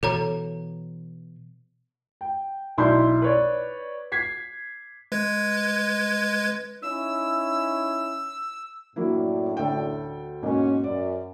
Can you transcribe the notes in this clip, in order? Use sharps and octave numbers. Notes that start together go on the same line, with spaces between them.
B2 E3 A4 C#5 A#5
G5
B1 E4 D5 C6 G6
B4 C#5 D5
G#6 B6 C7
G#3 B4 G#6
C#4 D#4 E4 E6
F#2 A2 F#3 A#3 D4 E4
D2 A4 G5
G#2 B2 A#3 C#4
F#2 D5